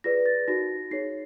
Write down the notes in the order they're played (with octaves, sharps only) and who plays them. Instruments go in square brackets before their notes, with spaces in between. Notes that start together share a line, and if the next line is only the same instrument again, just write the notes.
[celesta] F4 G#4 B4 D5 A#6
A6
D#4 F#4 A#4 A#6
D#4 G#4 C#5 C7